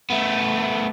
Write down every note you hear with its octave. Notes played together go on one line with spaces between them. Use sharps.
A3 B3